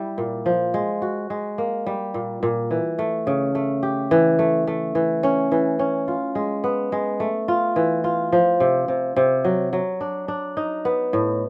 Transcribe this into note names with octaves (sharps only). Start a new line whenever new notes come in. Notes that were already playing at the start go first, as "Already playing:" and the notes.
Already playing: G3 E4
A#2
F3
G#3
F#4
G#3
A#3
G3
A#2
A#2
E3
A3
C#3
A3
G4
E3
A3
A3
E3
C#4
E3
C#4
F4
G#3
B3
G#3
A3
F4
E3
F4
F3
C3
C3
C3
F#3
F#3
D4
D4
D#4
B3
A2